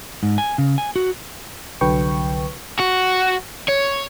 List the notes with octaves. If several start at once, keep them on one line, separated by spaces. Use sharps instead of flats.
G#2
G#5
C#3
G#5
F#4
C2 D3 F#3 B4 G5 C#6
F#4
C#5